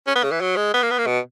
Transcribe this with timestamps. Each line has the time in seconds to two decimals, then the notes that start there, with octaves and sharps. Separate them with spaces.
0.07 C#4
0.15 B3
0.23 C#3
0.31 E3
0.41 F#3
0.56 G#3
0.74 B3
0.83 A#3
0.91 B3
0.99 A#3
1.06 B2